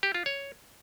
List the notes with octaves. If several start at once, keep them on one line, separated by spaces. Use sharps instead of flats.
G4
F4
C#5